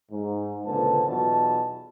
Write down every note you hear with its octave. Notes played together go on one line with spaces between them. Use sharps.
G#2
C#2 A#2 D3 B4 C5 A5
B1 E2 B2 F4 A5